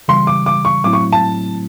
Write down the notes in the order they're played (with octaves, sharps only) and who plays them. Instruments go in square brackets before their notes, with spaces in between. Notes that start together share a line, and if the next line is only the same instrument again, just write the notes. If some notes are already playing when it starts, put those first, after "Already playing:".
[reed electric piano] C#3 E3 G3 [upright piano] C6
[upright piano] D6
D6
C#6
[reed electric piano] A2 F#3 A3 C4 E4 [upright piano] D6
[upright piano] C#6
A5